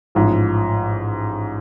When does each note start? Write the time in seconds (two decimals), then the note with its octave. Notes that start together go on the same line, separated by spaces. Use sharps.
0.15 A1 G#2 F3